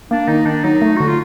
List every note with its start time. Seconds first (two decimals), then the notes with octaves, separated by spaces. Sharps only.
0.11 A#3 D4
0.28 D#3 D#4
0.46 D#3 D4
0.64 F#3 D#4
0.82 A3
0.96 D3 F#4
1.07 F4